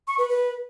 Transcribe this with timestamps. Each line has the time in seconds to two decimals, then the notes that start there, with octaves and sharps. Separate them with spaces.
0.07 C#6
0.18 B4
0.29 B4